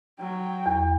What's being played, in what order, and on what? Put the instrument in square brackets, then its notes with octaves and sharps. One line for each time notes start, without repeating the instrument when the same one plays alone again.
[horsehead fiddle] F#3 G5
[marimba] E2